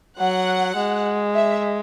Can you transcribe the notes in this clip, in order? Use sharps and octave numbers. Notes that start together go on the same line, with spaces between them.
F#3 F#5
G#3
E5